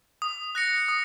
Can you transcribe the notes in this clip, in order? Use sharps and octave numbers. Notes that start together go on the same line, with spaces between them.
D#6
F#6 A#6 C#7
D#6